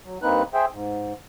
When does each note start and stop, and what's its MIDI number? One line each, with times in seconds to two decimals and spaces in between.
0.05 0.18 54
0.22 0.43 43
0.22 0.43 58
0.22 0.43 60
0.22 0.43 63
0.22 0.43 71
0.22 0.43 90
0.54 0.65 68
0.54 0.65 72
0.54 0.65 76
0.54 0.65 79
0.72 1.13 44